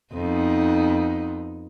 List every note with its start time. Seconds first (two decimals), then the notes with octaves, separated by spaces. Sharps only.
0.13 F2 B3 D#4